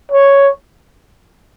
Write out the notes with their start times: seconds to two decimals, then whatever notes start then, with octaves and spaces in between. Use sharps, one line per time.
0.12 C#5